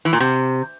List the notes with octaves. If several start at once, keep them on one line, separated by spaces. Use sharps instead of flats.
E3
A#2
C3